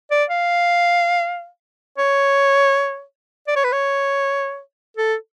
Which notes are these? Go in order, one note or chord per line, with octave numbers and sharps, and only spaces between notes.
D5
F5
C#5
D5
C#5
B4
C#5
A4